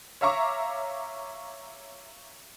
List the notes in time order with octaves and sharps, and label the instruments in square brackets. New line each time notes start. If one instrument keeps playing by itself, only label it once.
[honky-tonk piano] C#5 E5 F5 A#5 C#6 D6